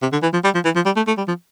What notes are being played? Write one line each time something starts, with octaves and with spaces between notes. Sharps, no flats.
C3
D3
E3
F3
G3
F3
E3
F3
G3
A3
A3
G3
F3